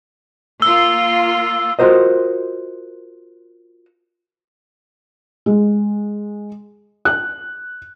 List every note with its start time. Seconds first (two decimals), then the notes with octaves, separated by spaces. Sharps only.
0.62 A#3 F4 E6
1.79 F4 F#4 A#4 C5 D#5
5.46 G#3
7.05 F#6